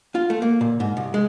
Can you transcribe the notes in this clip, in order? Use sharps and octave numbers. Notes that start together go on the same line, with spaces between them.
F4
A3
A#3
A#2
G#2
C2
G#3